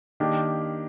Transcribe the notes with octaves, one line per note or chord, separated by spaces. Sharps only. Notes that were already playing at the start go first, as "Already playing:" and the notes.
D#3 A#3 D4 G4